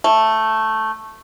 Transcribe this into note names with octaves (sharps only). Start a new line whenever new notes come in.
A3